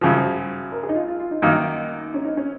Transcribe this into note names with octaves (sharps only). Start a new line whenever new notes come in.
F#2 C#3 F3 F4
G#4
F#4
A#4
G#4
D#4
F4
F4
F4
D#4
F#2 D#3 A#3 D#4
C#4
D#4
C#4